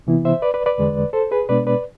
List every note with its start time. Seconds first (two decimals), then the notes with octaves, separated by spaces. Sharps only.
0.07 C3 E3 B3 E4
0.25 C5 E5
0.42 B4 D5
0.54 B4 D5
0.66 B4 D5
0.78 E2 D3 G#3
1.13 A4 C5
1.31 G#4 B4
1.49 B2 G#3 B3 D4 B4 D5
1.67 B4 D5